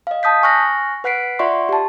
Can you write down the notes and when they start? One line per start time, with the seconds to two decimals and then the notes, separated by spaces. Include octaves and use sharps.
0.07 D#5 F5
0.23 A5 D#6 G6 B6
0.43 G#5 C#6 F6 F#6 A#6
1.04 B4 F#5 F#6 B6 C7 D7
1.39 F4 D5 E5 F#5 C6 C#6
1.69 G4 A5